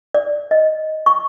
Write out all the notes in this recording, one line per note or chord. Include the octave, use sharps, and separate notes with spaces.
D5
D#5
C#6